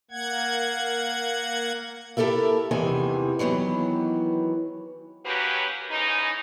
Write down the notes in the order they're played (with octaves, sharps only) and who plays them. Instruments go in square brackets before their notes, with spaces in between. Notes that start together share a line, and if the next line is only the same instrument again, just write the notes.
[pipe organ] A#3 F#5 G#6
[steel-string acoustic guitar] E4 G4 A4 A#4 E5
E2 C3 D#3 E3 G#5
D#3 E3 F#3 B3
[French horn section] F#3 A#3 C#4 F#4 G4 B4
G#2 E3 C#4 D#4